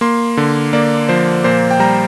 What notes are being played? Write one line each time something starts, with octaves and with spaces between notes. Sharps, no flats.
A#3 C6
D3
A#3 D5
F3 C5
A#2 C5
G5
G3 A#5